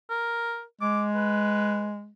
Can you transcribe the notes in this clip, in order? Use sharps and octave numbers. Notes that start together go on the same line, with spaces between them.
A#4
G#3 D6
B4